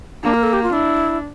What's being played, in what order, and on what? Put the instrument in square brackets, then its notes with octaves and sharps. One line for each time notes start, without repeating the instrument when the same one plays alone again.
[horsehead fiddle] A#3 [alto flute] D4
[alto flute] A#4
A4
G4
F4
[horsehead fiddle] D4 [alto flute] E4